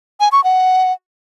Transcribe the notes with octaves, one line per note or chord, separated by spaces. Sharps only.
G#5
C#6
F#5